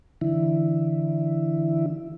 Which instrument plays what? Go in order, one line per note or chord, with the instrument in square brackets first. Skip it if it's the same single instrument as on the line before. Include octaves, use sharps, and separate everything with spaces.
[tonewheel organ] D3 E3 E4